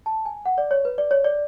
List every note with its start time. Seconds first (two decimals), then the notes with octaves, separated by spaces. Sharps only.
0.06 A5
0.25 G#5
0.46 F#5
0.58 D5
0.71 C#5
0.85 B4
0.98 D5
1.11 C#5
1.25 D5